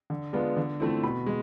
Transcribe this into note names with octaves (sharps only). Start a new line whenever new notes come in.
D3
G#3 B3 D4 F4
D3
F3 A3 C4 E4
B2 B5
G#3